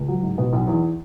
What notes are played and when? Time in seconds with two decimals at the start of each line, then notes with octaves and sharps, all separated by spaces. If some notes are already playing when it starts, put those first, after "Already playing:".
Already playing: C#2
0.08 F#3
0.23 G#2
0.38 B2
0.53 B1
0.67 E2